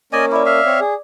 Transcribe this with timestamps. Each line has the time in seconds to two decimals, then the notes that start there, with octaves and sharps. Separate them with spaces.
0.13 A#3 C#4 D5 D#5 G#5
0.32 E4 D5 D6
0.46 E5 F5
0.66 C4 C#5
0.80 G#4